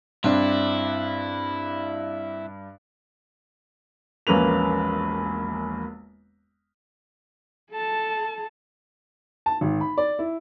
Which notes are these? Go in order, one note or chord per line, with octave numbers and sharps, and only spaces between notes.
G2 C4 D4 E4
E1 A#1 A#3 C#4 B4 F7
A4 A5
A5
G#1
B5
D5
E4